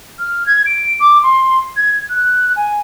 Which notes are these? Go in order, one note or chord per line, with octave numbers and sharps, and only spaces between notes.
F6
G#6
D7
D6
C6
G#6
F#6
G#5